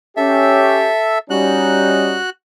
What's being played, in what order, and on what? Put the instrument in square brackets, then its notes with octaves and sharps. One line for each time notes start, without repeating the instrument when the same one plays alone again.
[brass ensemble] C#4 G4 [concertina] A4 E5
[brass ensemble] G3 C#4 D#4 [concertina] F#4 F#6